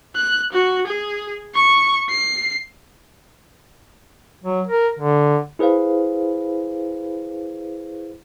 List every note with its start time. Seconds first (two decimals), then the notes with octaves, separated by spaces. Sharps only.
0.16 F#6
0.53 F#4
0.87 G#4
1.55 C#6
2.10 C7
4.44 F#3
4.67 A#4
4.99 D3
5.59 E4 G#4 B4 C5 F5